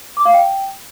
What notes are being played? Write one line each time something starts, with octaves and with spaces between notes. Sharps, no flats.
D6
F5
G5